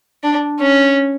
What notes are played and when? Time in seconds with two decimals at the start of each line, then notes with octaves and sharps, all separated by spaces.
0.23 D4
0.60 C#4